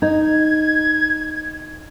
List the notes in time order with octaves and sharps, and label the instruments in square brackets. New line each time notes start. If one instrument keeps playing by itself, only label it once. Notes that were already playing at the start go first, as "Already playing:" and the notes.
[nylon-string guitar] D#4 [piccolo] G#6